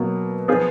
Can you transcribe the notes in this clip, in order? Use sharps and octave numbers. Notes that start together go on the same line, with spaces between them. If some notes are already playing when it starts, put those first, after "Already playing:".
Already playing: B2 F#3 A#3
F3 B3 F4 G#4